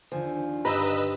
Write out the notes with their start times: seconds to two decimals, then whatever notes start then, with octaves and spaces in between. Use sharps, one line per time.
0.12 D#2 D3 F3 G#5
0.65 G2 G4 B4 C5 D#5 A#5 B5 E6